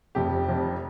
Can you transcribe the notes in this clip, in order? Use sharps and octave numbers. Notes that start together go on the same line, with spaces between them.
F1 F2 C3 G4
F1 F2 C3